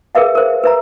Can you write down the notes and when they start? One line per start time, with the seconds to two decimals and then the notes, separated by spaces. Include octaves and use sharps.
0.15 G#4 A#4 B4 E5 F5
0.35 A#4 C5
0.64 B4 E5 A#5